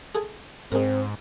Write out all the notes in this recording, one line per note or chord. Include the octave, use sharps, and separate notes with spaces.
G#4 A4 G#5
G#2 G#3 C4 A#4